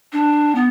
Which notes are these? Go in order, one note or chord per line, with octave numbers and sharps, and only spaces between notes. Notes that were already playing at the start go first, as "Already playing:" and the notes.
D4
B3